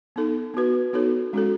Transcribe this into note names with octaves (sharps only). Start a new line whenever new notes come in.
B3 D#4 A4
B3 F#4 B4
B3 D#4 F#4 A4 C#5
G#3 C#4 F#4 A4